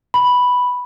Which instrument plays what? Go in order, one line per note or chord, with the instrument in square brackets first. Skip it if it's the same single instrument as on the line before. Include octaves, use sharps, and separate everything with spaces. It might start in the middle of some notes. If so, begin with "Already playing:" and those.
[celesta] B5